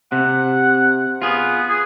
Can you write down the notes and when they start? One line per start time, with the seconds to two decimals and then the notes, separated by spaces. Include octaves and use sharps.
0.12 C3 F#5
1.22 B3 F4 G#4
1.69 G#4